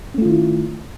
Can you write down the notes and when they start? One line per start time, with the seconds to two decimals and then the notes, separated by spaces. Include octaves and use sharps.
0.14 C#4
0.18 A3
0.22 F4
0.26 D#3
0.29 E4